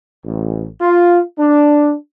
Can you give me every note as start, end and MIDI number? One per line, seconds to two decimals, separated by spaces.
0.25 0.67 33
0.81 1.21 65
1.39 1.95 62